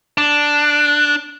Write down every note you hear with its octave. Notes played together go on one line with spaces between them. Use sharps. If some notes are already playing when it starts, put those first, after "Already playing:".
D4